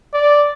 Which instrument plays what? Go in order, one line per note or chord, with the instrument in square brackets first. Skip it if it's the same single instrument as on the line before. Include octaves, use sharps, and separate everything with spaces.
[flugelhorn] D5